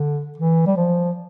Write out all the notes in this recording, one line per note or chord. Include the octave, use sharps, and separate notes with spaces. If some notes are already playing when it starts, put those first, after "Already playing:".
Already playing: D3
E3
G3
F3